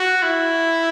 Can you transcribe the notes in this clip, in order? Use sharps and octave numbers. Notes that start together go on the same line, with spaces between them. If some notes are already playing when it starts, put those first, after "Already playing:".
Already playing: F#4
E4